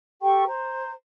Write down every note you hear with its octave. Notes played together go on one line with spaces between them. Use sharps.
G4 A4 G5 C#6
C5 A#5